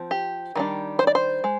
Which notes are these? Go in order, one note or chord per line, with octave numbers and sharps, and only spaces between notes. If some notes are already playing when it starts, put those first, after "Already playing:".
Already playing: F3 C4
G4
D#3 G3 D4
C5
D5
C5
G#3